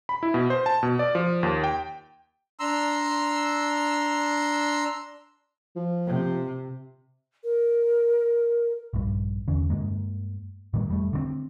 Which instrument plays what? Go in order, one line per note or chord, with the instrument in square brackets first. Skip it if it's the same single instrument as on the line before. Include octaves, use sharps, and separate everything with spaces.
[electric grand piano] B5
E4
B2
C5
A5
B2
D5
F3
D#2
G5
[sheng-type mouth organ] D4 A#5 C6 E6
[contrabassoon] F3
[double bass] C3
[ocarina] A#4
[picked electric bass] A#1 G2
E2 D3 C#4
G2 G#3 A#3
A2 D#3 G3 A#3
F1 G3 A3
D3 D#3 C4